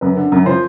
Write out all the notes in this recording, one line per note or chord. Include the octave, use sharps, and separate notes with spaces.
F#2 B4
D3
F#2
F3 C5